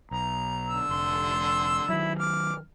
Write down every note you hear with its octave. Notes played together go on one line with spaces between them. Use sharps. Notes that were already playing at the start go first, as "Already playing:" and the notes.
B1 A#5
D3 E6
F1 C6
D#3 F#3 E4
D6 F6